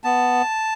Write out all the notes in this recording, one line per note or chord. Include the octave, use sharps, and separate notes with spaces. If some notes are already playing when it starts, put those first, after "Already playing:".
B3 A5